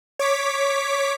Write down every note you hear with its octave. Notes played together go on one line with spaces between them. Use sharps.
C#5 D6 B6